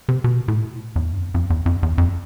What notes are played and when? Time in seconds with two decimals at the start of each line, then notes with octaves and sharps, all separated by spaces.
0.09 C3
0.24 B2
0.48 A2
0.96 E2
1.13 G2
1.18 F2
1.34 F2
1.50 E2
1.66 F2
1.83 E2
1.98 F2